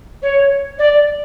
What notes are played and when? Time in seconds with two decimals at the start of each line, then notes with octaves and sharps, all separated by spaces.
0.22 C#5
0.78 D5